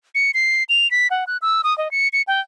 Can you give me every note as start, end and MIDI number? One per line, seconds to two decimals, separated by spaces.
0.15 0.31 97
0.34 0.63 96
0.69 0.90 101
0.91 1.07 95
1.11 1.24 78
1.27 1.37 90
1.42 1.62 88
1.64 1.76 87
1.78 1.91 75
1.91 2.08 97
2.13 2.22 97
2.27 2.40 79